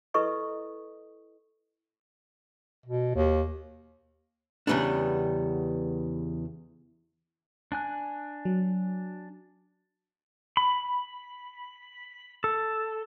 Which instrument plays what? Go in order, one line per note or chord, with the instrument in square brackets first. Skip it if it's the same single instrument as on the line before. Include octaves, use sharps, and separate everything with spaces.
[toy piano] E4 A4 B4 D#5 C#6 D#6
[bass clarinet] B2
D#2
[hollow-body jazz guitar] E2 C#3 G3 B3 D4
[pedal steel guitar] D4 G#5 F#6
[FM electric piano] F#3
[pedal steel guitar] B5
A4